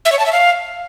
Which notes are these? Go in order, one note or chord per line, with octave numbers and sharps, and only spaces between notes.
E5
C#5
A5
E5
F5